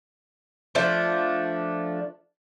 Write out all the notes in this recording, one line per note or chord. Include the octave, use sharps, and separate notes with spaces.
F3 A3 D4